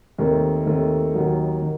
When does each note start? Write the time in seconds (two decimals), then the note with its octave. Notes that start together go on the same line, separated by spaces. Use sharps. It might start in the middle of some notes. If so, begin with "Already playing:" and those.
0.18 D#2 D#3 A3 C4
0.66 D#2 D#3 A3 C4
1.14 D#2 D#3 F#3
1.62 D#3